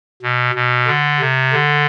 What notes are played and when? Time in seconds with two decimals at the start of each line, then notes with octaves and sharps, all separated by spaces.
0.22 B2
0.55 B2
0.87 D3
1.20 C3
1.53 D3